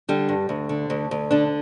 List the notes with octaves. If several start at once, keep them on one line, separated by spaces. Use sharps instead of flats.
D3 G3
G2
D2
D3
D2
D2
D3 D4